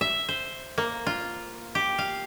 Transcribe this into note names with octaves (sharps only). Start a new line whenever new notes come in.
E5
C5
A#3
F4
G4
F5